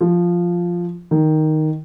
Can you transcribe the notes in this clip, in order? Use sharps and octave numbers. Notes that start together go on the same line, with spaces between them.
F3
D#3